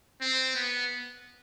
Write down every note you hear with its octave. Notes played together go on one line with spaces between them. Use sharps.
C4
B3